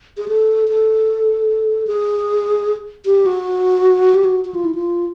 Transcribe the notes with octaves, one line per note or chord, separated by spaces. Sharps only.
G#4
A4
A4
G#4
G4
F#4
G4
F#4
F#4
F4
E4
F4